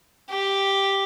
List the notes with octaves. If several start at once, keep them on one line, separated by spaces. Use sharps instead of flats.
G4